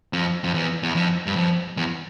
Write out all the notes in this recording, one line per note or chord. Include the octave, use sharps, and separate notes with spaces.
F2
F2
E2
E2
F2
G2
F2
E2